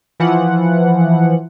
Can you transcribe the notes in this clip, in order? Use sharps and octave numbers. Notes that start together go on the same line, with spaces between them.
E3 F3 F#5